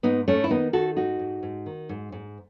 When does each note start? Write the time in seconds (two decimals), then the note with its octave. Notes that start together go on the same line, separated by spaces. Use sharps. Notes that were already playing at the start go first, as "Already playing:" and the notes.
0.03 G#2 B3 D#4
0.27 G#2 A3 C#4
0.44 E4
0.50 D#3 B3 D#4
0.73 D#3 F#4 A4
0.97 G#2 D#4 F#4
1.19 G#2
1.43 G#2
1.66 D#3
1.89 G#2
2.12 G#2